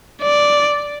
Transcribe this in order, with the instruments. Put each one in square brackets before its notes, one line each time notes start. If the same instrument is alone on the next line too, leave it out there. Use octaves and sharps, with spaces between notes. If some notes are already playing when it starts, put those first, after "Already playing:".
[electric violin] D5